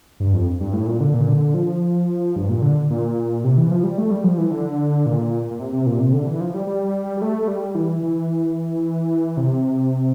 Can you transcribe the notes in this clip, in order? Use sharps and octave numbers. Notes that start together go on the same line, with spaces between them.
G2
F2
G2
A2
A#2
D3
A#2
D3
F3
G2
A#2
D3
A#2
C3
E3
F3
G3
A3
G3
F3
E3
D3
A#2
A#2
C3
C3
A#2
C3
D3
E3
F3
G3
G3
G3
A3
G3
E3
E3
C3